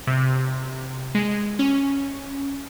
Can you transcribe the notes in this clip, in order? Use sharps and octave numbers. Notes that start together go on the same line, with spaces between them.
C3
G#3
C#4